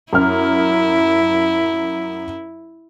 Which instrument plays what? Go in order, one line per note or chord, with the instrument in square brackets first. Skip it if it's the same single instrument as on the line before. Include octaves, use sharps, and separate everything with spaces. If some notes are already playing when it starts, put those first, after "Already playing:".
[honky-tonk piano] F#2 F6 [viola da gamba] E4